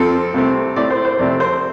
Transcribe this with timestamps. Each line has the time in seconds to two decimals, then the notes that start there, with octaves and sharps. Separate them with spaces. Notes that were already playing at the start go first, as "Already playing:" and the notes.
Already playing: F2 F3 C4 A4
0.34 C2 C3 A3 C4
0.76 A2 A3 C4 D5
0.90 C5
1.05 C5
1.19 F2 C3 A3 C4 D5
1.40 C5